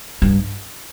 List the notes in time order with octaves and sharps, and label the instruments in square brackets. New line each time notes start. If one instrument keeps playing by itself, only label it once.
[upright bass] G2